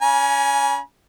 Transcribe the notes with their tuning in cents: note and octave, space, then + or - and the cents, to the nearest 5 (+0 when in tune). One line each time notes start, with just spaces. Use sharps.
C#4 +30 G#5 +10 B5 -45